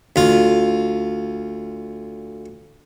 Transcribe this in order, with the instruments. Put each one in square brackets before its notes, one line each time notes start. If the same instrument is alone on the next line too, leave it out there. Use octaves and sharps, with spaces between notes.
[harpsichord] D2 F4